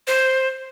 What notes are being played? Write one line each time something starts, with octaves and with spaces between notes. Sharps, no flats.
C5